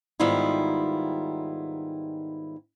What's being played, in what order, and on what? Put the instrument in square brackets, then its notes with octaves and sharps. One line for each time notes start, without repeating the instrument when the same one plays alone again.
[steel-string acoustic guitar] G#2 D#3 G3 B3 E4 F4